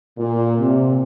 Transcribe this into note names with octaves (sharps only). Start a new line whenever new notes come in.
A#2
C3